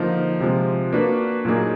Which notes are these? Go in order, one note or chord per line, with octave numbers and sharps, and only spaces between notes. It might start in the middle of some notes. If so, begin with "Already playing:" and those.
Already playing: D3 F3 A#3 D#4
C3 F3 G#3
A#3 D4 F#4 B4 D5
A#2 F#3 A#3 D#4 G#4